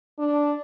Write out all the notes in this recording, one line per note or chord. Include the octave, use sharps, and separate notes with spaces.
D4